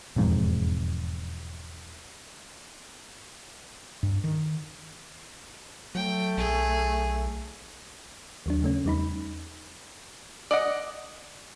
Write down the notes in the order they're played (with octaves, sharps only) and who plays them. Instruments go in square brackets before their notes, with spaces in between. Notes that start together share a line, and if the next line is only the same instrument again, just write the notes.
[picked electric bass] E1 F2 G#2
[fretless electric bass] G2
D#3
[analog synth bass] F#3 [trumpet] A3 [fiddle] G5
[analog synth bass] B1 [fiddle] G#4
[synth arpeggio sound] D#2 F#3 D4
C#3 A3 C#4
E2 G3 D#4 B5
[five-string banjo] D5 D#5 F#5